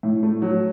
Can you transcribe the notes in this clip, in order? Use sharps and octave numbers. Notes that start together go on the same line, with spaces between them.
A2
A3
F#3